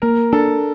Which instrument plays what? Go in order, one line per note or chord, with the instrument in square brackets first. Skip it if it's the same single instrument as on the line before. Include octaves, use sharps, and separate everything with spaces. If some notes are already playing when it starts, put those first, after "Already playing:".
[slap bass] A#3 [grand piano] A#4
[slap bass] D4 [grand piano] A4